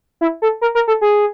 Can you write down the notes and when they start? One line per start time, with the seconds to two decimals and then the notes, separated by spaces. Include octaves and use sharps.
0.21 E4
0.42 A4
0.61 A#4
0.75 A#4
0.88 A4
1.01 G#4